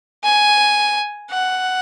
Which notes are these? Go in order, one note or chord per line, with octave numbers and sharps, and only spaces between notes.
G#5
F#5